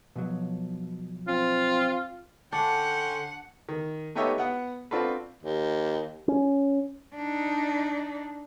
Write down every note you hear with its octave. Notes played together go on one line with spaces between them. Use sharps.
B2 F3 F#3
C4 F4
D3 C#4 D4 F#5 G5 C6
D#3
A3 B3 D#4 G4 C#5 E5
B3 F#5
C4 D4 F4 F#4 A4 B4
D#2
C#4
D4 D#4